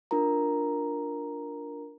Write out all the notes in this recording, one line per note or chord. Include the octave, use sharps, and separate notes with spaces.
D4 F4 A#4 A#5